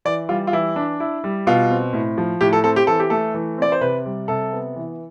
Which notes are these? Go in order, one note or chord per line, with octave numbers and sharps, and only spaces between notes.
E3 D5
G3 F4
F4
E3 E4
D4
E4
G3
B2 F4
C4
A2
F3
A2 G4
A4
C4 A4
G4
E3 A4
G4
A3 A4
E3
C4 D5
C5
C3 B4
G3
C3 A4
B3
E3